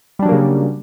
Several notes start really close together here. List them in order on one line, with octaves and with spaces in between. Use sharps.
G3 D4 F#3 A#3 C#3